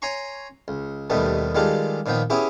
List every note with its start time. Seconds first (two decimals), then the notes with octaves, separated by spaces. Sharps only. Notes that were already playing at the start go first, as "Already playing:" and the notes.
0.02 C#5 G#5 A#5 C6 C#6
0.68 C#2
1.10 D#2 B2 D#3 G3 A3 B3
1.55 D#3 G3 G#3 F4 G4 A4
2.06 A#2 D#3 F3 B3 G5
2.30 B3 C#4 E4 G4 G#4